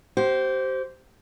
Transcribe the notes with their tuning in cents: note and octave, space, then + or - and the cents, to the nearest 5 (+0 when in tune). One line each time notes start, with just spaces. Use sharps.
G4 -35 C5 +0